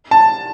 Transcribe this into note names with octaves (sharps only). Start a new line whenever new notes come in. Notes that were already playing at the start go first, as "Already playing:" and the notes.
A5